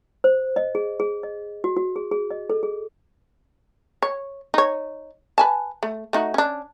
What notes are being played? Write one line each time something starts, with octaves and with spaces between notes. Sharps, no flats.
C5
D#5
G#4
G#4
D#5
F#4
F#4
G#4
G#4
D#5
A4
G#4
C#5
D#4 C#5
B4 G#5 A5
A3
A3 D#4 F#4
C#4 D4